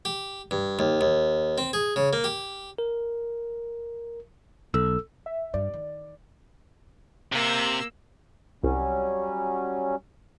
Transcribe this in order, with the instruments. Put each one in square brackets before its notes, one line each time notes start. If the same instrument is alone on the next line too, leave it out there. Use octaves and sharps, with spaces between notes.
[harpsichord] G4
G2
D#2
D#2
C4
G#4
C#3
A#3
G4
[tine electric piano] A#4
[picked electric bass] B1 [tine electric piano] A4 E6
[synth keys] E5
[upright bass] G2 [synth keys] D5
[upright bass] D#3
[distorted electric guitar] C3 [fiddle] A#3 E6
[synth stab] C2 [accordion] F#3 G3 C#4